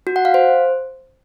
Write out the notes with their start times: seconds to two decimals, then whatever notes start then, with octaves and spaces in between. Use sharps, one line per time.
0.07 F#4
0.16 F#5
0.25 F5
0.34 C5